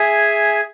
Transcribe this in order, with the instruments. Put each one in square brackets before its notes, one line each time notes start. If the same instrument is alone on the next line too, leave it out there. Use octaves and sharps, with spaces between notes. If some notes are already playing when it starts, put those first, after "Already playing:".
Already playing: [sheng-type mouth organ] G#4 E5 G#5